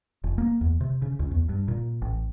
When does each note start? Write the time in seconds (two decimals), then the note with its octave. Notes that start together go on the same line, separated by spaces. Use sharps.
0.24 F1
0.38 A#3
0.61 E2
0.81 C3
1.02 C#3
1.19 C#2
1.31 E2
1.49 G2
1.68 A#2
2.02 A1